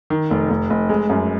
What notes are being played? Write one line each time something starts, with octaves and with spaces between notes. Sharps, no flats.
D#3
F1
F1
F1
G#3
F#2